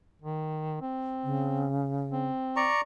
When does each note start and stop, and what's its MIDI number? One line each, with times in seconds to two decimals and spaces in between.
0.22 0.79 51
0.81 1.66 60
1.24 2.29 49
2.11 2.68 60
2.56 2.81 74
2.56 2.81 82
2.56 2.81 85